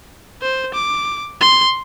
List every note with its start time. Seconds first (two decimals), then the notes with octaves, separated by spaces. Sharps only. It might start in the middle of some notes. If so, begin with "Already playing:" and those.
0.42 C5
0.74 D6
1.41 C6